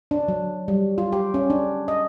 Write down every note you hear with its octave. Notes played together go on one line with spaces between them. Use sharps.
D4
F#3
G3
F4
G4
C#4
D4
D#5